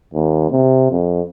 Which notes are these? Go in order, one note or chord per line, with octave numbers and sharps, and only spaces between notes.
D#2
C3
F2